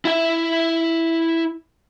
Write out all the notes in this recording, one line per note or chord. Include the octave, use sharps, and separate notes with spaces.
E4 E5